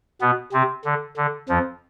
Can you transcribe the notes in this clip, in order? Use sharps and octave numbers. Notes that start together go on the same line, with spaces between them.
B2 B3
C3 C4
D3
D3
F2 F3